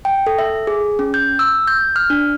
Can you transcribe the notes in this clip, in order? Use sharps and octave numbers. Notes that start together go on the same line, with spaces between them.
G5
A4
E5
G#4
C#4
G6
E6
G6
F6
D4